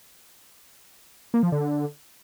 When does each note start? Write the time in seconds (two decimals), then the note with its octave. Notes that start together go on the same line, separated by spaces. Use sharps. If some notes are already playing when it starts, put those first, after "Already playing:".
1.34 A#3
1.43 F3
1.52 D3